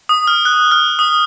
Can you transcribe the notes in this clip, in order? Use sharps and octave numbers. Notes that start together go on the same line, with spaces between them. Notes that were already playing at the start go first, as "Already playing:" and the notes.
D#6
F6
F#6
F6
D#6